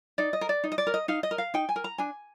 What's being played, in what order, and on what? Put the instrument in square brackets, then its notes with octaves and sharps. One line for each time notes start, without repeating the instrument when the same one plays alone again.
[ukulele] D#4 D5
D#5
A#4
D5
D#4
D#5
D5
A#4
D#5
D#4 F5
D#5
A#4
F5
D#4 G5
G#5
A#4
A#5
D4 G#5